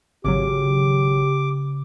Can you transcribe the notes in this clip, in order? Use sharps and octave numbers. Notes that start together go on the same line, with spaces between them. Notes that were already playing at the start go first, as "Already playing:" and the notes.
G#1 C#3 F#3 G4 D6